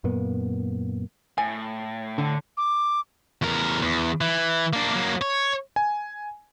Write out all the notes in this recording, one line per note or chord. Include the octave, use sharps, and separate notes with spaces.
F#2 A#2 A#3 B3
A2 G#5
D3
D6
E2 A#4
E2
E3
A#3 D4
F#3 A#3
C#5
G#5